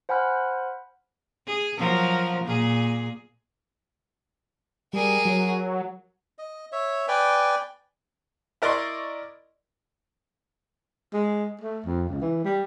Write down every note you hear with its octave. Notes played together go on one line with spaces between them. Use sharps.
C5 F#5 G#5 B5 F6 F#6
G#4
F3 F#3 A#4
A#2 G#4
G3 G#4 A#4
F#3
D#5
C#5 E5
B4 D5 G5 G#5
E4 A#4 D5 D#5 C6 C#6
G#3
A3
F2
C#2
E3
G3